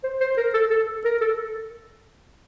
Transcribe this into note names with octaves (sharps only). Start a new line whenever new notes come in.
C5
C5
A#4
A4
A4
A#4
A4